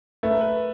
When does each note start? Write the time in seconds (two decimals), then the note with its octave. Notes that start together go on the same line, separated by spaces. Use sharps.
0.23 A3 B4
0.31 A#4
0.41 B4